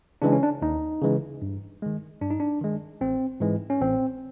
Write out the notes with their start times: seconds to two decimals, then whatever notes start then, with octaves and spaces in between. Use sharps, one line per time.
0.22 C#3 E3 G#3 D4
0.32 C#4
0.43 D4
0.62 D#2 D#4
1.02 C#3 E3 G#3
1.42 G2
1.82 D#3 G#3
2.22 G2 D4
2.30 D#4
2.40 D4
2.61 D#3 G#3
3.01 A1 C4
3.40 G#2 E3 G#3
3.70 C#4
3.81 A1 C4